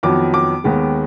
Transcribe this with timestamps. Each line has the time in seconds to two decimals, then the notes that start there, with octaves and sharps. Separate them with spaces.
0.03 F2 D#3 F#3 B3 D6
0.34 D6
0.64 D#2 D#3 G#3 B3